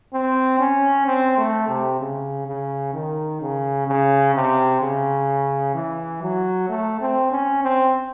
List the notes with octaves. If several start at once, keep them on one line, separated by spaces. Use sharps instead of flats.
C4
C#4
C4
A3
C3
C#3
C#3
D#3
C#3
C#3
C3
C#3
E3
F#3
A3
C4
C#4
C4